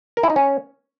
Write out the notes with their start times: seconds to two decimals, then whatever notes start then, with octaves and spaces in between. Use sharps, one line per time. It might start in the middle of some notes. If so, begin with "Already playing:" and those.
0.17 A#4
0.23 E4
0.30 D#4
0.36 C#4